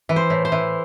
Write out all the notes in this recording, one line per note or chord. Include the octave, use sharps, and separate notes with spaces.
E3
C5
A2
C5
E3